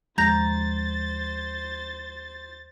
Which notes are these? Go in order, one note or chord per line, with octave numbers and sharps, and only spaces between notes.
D#2 F3 G#3 C5 A#5 G6 A6 A#6